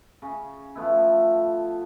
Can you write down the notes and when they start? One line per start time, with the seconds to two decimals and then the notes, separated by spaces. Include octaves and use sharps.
0.22 C#3
0.75 F3 A3 B3 E4